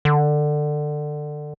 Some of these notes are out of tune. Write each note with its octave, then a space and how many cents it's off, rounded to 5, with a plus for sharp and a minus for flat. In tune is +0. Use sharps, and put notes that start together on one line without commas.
D3 +20